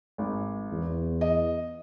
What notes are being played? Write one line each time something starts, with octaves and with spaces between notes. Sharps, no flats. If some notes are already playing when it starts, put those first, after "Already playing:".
G#1
E2
D#5